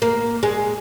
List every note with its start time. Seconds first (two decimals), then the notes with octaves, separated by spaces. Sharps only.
0.02 A#3
0.43 G#3